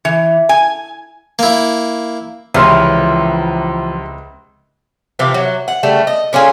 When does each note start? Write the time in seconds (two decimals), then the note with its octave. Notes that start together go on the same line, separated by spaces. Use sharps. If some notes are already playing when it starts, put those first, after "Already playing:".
0.05 E3
0.49 G#5
1.39 A#3 E4
2.54 C#2 C3 E3 F3 C#4 E5 C6 F6
5.19 C3 E3 F3 G4
5.34 F#3
5.68 F#5
5.83 C#3 G3 A3
6.07 D#5
6.33 D3 C#4 F4 G#4